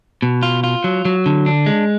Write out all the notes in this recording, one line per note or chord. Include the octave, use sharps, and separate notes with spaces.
B2
F4
F4
F#3
F#3
D3
D4
G#3